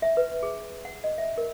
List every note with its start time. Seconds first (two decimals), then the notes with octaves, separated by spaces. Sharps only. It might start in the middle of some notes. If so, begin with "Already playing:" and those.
0.02 E5
0.17 B4
0.43 G#4
0.85 F#5
1.04 D#5
1.18 E5
1.38 A#4